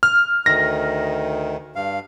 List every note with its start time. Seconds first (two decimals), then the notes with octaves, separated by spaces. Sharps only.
0.03 F6
0.46 D2 D#3 A#6
1.76 G2 F5